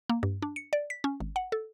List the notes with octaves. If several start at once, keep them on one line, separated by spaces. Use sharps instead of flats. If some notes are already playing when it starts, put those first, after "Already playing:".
A#3
G2
D4
C#7
D5
B6
C#4
G#1
F#5
A4